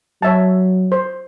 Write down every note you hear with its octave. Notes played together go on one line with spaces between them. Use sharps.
F#3 C#5 E5 A5
C5